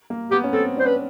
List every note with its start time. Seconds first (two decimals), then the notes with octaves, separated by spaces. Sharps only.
0.10 A#3
0.31 B3 G4
0.44 C#4
0.53 C4 A4
0.77 D4 C5
0.85 C#4 B4